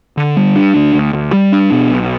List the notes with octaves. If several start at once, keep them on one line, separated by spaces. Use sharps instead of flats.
D3
G3
D4
D2
D2
D2
G3
D4
B2
B1